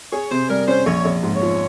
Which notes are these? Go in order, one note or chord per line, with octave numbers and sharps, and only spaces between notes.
G#4 C#5
C3 C5
G3 A#4
C#4 C5
A#1 C#5
A#1
G#2
C#5
F3